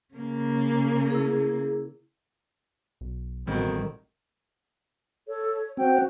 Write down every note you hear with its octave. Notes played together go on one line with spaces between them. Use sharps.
C#3 A#3
E4 G#4
B1
A1 F2 B2 D#3 G3
A4 C#5
C4 F#4 G5